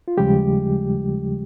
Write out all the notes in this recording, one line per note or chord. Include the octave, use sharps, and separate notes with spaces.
F4
D#2 C#3 F3 G3 G#3 G4